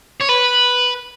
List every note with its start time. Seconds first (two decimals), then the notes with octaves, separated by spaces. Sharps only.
0.20 C#5
0.29 B4